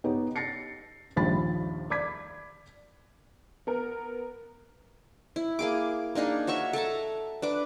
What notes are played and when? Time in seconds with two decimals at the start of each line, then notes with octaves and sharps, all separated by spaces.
0.04 B3 D#4 G4 B4 C#5
0.36 A6 A#6 C7 C#7
1.16 A#1 D#2 F3 G3 B5 A6
1.90 D5 B5 D6 G#6 B6
3.67 B3 A#4
5.36 E4
5.59 A#3 G#4 D6
6.15 A#3 D4 D#4 G#4
6.47 F#4 C#5 E5 C#6
6.73 A4 E5 A5 A#5
7.42 D4 B4 D6